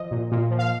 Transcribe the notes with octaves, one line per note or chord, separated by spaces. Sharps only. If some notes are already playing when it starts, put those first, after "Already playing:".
Already playing: F3 D#5
A#2
A#2
F3
F5